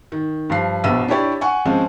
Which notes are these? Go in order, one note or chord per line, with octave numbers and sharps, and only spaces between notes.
D#3
G2 F3 C7
A#1 B2 E6 D#7
D4 E4 G4 C#5 D5
F#5 G#5 C#6
F3 G#3 C4 C#4